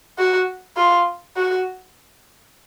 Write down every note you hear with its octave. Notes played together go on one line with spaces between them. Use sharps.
F#4
F4
F#4